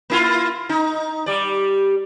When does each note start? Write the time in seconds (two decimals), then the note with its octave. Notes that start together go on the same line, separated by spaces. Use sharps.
0.10 A#3 E4 F4
0.69 D#4
1.26 G3 D5